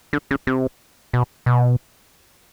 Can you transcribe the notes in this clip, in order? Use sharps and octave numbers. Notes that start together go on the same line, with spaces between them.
D3
C#3
C3
B2
B2